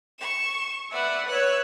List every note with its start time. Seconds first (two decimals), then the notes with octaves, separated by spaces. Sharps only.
0.19 C#6 E7
0.91 B4 D5 E5 F#5
1.28 B4 C#5 E6 F#6